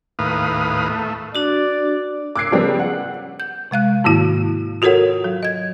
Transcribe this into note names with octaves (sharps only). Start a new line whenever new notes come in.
D#2 A2 B4 F5 D#6
A3
D4 F#4 D5
D6 E6 F#6 G#6 C7 D7
C#3 F3 G3 B3 C#4
F#5
G6
C3 G#3 F5 F#6
G#2 D#3 A#3 E4 F#4
F4 F#4 A4 A#4 C#5 F#5
F#3
D#5 G#6